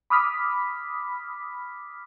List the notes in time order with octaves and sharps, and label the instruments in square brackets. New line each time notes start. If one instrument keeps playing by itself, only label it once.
[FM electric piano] B5 D6 D#6 F6 B6